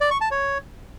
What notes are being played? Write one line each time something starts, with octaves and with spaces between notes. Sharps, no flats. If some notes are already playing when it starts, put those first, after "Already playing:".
D5
C#6
A5
C#5